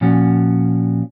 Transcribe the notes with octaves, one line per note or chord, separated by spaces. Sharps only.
A#2 F3 C#4 F#4